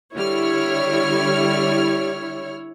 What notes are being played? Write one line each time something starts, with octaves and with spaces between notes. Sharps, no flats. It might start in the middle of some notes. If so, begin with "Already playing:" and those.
D3 G3 E4 C#5 F6